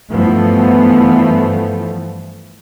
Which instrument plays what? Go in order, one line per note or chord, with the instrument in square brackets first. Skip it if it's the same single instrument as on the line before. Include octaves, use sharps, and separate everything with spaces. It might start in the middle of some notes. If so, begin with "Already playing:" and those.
[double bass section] G2 E3 F3 A3 B3